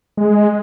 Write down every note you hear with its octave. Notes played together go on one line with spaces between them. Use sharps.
G#3